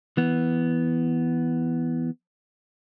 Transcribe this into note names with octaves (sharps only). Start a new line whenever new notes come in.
E3 B3